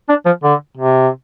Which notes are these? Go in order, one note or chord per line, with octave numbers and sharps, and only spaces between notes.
D4
F3
D3
C3